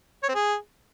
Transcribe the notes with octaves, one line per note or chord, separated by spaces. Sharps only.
C#5
C4
G#4